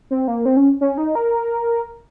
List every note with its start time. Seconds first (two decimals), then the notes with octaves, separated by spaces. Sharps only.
0.11 C4
0.28 A#3
0.46 C4
0.57 C#4
0.81 C#4
0.98 D#4
1.15 A#4